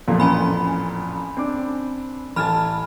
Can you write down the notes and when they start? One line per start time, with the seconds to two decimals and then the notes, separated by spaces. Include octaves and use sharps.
0.08 A1 F2 A#2
0.20 C#4 G#5 B5
1.37 C4 D4 D6
2.36 A1 G#5 A5 B5 F6